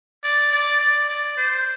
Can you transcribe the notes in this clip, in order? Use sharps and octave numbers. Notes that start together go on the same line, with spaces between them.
D5
D5
D5
D5
C5